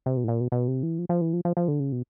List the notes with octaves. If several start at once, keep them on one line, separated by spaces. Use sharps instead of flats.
C3
B2
A2
A#2
B2
B2
C3
E3
F3
F3
E3
F3
F3
F3
D3
C#3
B2